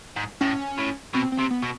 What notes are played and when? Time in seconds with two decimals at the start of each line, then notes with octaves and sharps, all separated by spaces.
0.16 G#2
0.41 A2 C#4
0.78 A2
1.14 B2 C4
1.32 C4
1.39 C3
1.50 B3
1.63 B2